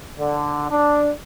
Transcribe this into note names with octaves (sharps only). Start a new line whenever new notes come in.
D3
D4